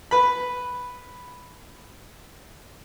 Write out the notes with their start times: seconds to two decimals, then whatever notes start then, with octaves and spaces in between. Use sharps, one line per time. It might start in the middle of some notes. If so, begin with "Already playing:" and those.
0.11 B4 B5